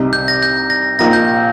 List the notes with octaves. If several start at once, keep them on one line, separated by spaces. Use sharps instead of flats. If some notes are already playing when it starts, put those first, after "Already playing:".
Already playing: C2 C3 G3 D#4
G6
A#6
G6
A#6
A#1 A#2 A#3 D#4 A#6
G6